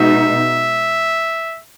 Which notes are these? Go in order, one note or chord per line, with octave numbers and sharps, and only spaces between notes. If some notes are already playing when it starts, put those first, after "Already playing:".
Already playing: B2 G#3 D#4 E5